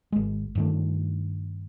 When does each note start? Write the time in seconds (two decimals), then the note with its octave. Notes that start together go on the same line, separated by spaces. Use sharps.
0.12 G#1 G#3
0.55 G2 D#3 A3